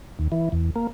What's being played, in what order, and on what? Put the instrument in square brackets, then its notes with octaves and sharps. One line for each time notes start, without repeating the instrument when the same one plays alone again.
[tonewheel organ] D#2
E3
E2
A#3